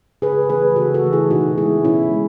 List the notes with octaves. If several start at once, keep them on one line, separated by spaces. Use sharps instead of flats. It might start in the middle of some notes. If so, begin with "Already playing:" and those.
C#3 G#4 B4
E3 A3 G#4 B4
C#3 F#4 A4
F#4 A4
E3 A3
E4 G#4
B2 D#4 F#4
G#3 B3 E4 G#4
B2 C#4 E4
G#3